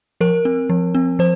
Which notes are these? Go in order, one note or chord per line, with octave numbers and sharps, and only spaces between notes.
F3 A#4
C4
F3
C4
F3 C5